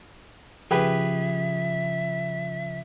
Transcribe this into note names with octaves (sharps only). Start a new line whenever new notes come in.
C#3 F3 G4 G#4 B4 E5